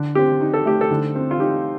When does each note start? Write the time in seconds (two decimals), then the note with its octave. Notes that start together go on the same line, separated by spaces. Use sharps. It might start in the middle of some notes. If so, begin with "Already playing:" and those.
Already playing: D3
0.15 C4 G4
0.41 D#4
0.54 A4
0.65 A3 G4
0.81 A4
0.91 D3
1.15 C4
1.31 F4
1.40 D#4 G4